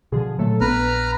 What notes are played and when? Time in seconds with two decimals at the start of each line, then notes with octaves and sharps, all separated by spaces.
0.12 B2 D3 F3 G#4
0.39 A#2 F#3 A3 A4
0.61 A#1 B3 B4 A#5 F6